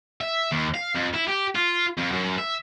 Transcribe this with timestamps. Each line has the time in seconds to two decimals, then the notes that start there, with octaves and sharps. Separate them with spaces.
0.21 E5
0.52 D#2
0.74 F5
0.95 F2
1.14 E4
1.28 G4
1.55 F4
1.97 F2
2.12 F#2
2.38 E5